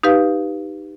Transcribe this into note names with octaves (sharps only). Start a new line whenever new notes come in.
D#4 G4 B4 F5